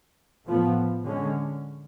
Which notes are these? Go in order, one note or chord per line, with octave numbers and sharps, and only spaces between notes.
A2 F3 B3
D3 G#3 C#4